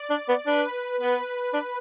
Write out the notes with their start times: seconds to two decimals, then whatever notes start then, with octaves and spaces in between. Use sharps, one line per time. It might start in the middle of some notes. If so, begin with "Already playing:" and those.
Already playing: D5
0.10 D4
0.28 B3
0.46 D4 B4
1.00 B3 B4
1.53 D4